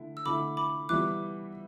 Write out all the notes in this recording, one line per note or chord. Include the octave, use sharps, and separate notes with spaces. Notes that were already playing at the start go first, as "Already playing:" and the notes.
Already playing: D3 A3 E4
E6
D3 A3 E4 B5 D6
B5 D6
E3 G3 B3 D6 F#6